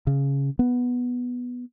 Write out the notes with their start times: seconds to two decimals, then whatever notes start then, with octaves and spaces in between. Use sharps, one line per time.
0.07 C#3
0.59 B3